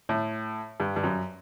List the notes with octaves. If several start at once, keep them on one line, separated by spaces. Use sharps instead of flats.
A2
G2
G2
F#2